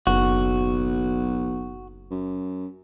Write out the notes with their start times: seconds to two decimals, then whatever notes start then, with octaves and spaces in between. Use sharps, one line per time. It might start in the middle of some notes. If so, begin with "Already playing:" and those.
0.07 F#1 B1 F#4
2.11 F#2